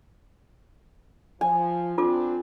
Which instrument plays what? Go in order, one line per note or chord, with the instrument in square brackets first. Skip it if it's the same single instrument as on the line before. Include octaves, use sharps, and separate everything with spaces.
[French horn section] F3 [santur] G#5
[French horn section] C4 D4 [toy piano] F4 A4 D6